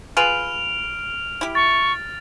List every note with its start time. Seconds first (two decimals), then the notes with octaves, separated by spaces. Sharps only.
0.17 F4 G#4 B4 F6 D7 F7
1.41 E4 G4
1.55 C#6 A6